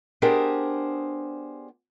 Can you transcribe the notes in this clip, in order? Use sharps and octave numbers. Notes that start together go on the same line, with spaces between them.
B3 D4 G4 G#4 A#4 C5